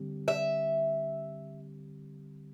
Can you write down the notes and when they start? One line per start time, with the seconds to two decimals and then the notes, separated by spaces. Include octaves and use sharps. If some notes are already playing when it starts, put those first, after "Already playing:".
Already playing: D3 G3 C4 G4
0.28 E5